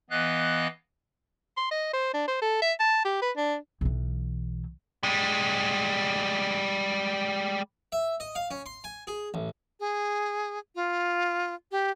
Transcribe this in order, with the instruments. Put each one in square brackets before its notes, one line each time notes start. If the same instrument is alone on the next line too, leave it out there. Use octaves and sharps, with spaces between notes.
[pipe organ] E3 B3 D#5 F5 F#6
[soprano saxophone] C6
D#5
C5
D4
C5
A4
E5
A5
G4
B4
D4
[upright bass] B1 E3
[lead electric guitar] G3 G#3
[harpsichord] E5
D#5
F5
C#4
C6
G#5
G#4
A1
[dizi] G#4
F4
G4